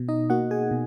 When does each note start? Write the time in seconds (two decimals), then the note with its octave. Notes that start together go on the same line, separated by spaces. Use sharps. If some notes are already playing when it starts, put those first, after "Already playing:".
Already playing: B2
0.08 D#4 D#5
0.30 A#3 F#4 F#5
0.51 G#4 G#5
0.71 B2